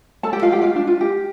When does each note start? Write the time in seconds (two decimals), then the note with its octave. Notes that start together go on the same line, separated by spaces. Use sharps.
0.23 A4 A5
0.33 G4 G5
0.42 F4 F5
0.52 G4 G5
0.62 F4 F5
0.76 D4
0.87 F4
1.01 G4